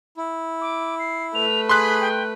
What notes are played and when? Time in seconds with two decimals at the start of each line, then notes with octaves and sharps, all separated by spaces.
0.17 E4
0.61 D6
0.99 C7
1.35 A3 B4 F7
1.69 G#4 B5 C6 F#6 B6
2.01 G5